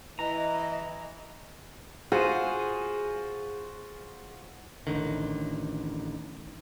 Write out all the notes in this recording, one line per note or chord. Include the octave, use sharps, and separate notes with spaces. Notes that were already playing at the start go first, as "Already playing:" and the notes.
E3 D#5 A#5
F4 F#4 G#4 C5
A1 D3 D#3